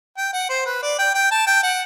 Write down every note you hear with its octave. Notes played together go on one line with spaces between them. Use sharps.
G5
F#5
C5
B4
D5
G5
G5
A5
G5
F#5